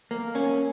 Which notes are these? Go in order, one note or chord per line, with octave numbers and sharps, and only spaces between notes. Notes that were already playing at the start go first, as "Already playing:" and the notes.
A#3
C#4